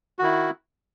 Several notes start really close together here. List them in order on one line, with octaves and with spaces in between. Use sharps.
F#4 D#3 E4